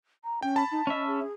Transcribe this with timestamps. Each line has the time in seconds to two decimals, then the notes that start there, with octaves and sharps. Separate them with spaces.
0.24 A#5
0.42 C#4 G5
0.56 A5 B5
0.71 D#4
0.87 C#4 D#5 E5
1.07 G#4